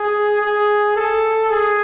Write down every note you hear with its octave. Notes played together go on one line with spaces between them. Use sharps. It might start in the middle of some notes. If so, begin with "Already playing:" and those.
Already playing: G#4
G#4
A4
G#4